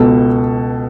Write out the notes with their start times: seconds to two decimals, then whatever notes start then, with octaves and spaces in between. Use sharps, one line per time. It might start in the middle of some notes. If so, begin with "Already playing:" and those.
Already playing: C#2 B2 A4